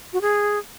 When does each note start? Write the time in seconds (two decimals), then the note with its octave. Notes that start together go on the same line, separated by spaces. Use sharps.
0.13 F#4
0.21 G#4